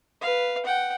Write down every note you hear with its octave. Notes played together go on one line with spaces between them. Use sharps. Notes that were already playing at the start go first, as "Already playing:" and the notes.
B4 F5
F#5 G5